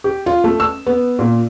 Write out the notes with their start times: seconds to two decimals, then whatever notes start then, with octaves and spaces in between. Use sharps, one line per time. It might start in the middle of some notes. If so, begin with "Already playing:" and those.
0.04 G4
0.26 F4
0.44 A3
0.60 E6
0.86 B3
1.19 A#2